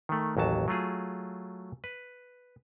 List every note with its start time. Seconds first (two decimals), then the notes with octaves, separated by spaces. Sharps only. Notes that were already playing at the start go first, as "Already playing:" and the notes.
0.09 D#3 A3
0.37 A1 D#2 F#3 A5
0.68 F#3 A3 F4 G#4
1.84 B4